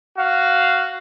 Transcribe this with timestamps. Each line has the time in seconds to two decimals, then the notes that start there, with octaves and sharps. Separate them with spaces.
0.18 F#4 F5